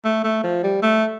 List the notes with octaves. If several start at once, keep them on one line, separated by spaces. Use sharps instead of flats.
A3
A3
F3
G3
A3